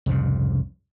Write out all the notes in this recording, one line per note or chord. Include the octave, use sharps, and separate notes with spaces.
C2 F2 G#2 C#3